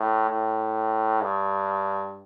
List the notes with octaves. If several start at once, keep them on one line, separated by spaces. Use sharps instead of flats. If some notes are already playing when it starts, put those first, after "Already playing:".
Already playing: A2
A2
G2